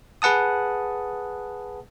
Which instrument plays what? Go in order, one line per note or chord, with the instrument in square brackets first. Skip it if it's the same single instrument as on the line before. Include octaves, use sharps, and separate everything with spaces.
[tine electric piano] G#4 B4 F#5 A5 D#6